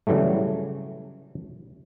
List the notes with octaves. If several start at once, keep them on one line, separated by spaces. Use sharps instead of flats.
C#3 E3 F#3 G3 A3